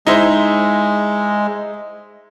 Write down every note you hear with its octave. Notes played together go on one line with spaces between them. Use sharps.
G#3 D#4 E4 C5